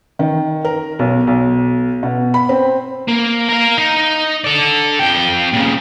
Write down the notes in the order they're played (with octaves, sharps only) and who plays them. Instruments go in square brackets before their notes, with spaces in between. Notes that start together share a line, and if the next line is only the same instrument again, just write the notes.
[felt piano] D#3
A#4
B1
B1
B2
B5
C4
[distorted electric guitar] A#3
A#4 F5
D#4
A4 D5
F2 G5
A#2 C#3